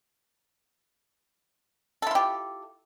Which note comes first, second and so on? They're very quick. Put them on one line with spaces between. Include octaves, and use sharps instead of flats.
A4 E4 F4 G4